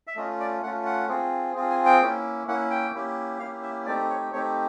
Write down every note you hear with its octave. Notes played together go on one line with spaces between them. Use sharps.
E5
A3 C#4 F4 D#5
D5
A3 C#4 F4 F#5
F#5
C4 F4 G#4
C4 F4 G#4
G#5
G5
A#3 C#4 E4
A#3 C#4 E4 F#5
G5
A#3 C#4 E4 G4
A#3 C#4 E4 G4 F5
E5
A3 C4 D#4 G4 D5
C#5
A3 C4 D#4 G4 C#5